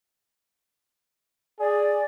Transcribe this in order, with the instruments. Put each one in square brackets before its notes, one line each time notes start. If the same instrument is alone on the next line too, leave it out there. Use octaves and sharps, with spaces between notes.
[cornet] G#4 [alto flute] D5